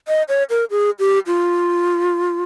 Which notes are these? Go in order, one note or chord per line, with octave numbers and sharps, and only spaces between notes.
D#5
C#5
A#4
G#4
G4
F4